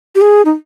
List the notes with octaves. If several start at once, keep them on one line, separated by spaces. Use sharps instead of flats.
G4
G#4
D#4